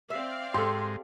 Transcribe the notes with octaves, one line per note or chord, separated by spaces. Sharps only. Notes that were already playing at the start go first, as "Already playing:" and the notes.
C4 D5 E5 F5
G#2 G4 A4 C6